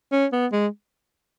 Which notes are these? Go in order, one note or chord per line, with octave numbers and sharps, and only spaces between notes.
C#4
B3
G#3